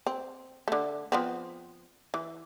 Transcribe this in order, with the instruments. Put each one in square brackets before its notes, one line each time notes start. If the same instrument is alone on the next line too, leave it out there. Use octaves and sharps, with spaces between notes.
[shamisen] C4
D3 A3
F3 B3 C4
E3